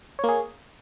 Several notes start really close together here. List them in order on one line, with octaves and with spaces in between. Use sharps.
C#5 A#3 G#4